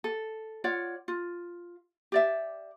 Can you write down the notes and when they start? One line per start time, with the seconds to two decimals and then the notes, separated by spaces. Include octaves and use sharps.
0.04 A4
0.64 F4 C#5 D5 F#5
1.08 F4
2.12 G4 D5 E5